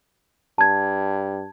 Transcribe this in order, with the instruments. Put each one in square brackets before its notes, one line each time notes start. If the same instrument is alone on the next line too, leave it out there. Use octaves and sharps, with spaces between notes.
[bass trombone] G2 [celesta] A5 G#6